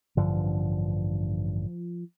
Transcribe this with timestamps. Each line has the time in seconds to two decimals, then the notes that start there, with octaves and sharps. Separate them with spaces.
0.17 A1 G2 D3 F3